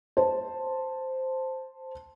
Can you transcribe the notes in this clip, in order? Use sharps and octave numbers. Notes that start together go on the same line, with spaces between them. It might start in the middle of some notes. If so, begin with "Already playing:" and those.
C5 A5